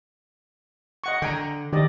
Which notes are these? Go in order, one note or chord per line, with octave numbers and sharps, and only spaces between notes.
D#5 F#5 C#6
D3 G5 G#5 A#5
D#3 G4 D5 D#5